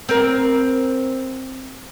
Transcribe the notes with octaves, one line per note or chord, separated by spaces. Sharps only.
C4 A#4